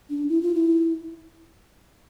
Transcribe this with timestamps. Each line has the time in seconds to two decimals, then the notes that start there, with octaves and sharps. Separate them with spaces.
0.10 D4
0.29 E4
0.42 F4
0.55 E4